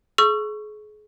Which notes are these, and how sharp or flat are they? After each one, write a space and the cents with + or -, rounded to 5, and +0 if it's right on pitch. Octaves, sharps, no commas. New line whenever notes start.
G#4 +35 C#6 +0 E6 +40